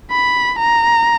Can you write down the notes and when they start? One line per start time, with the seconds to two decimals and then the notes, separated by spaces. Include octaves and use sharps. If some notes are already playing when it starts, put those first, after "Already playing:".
0.11 B5
0.59 A#5